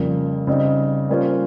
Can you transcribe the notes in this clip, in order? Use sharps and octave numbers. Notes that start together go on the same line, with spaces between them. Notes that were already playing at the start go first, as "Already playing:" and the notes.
Already playing: F2 C#3 G3 A#3
C#3 G3 C4 D#4
G3 A#3 C#4 F4 C5